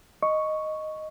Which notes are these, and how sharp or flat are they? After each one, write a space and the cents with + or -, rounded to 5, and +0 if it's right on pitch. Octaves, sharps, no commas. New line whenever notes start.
D#5 +0 C#6 +0